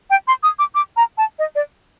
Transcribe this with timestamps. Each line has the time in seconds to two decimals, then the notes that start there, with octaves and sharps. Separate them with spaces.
0.10 G5
0.27 C6
0.43 D#6
0.59 D6
0.75 D6
0.96 A#5
1.18 A5
1.39 D#5
1.55 D5